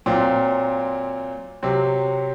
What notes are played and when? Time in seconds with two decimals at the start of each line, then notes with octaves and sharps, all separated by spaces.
0.06 A#2 F#3 C4 F4
1.63 C3 F#3 C4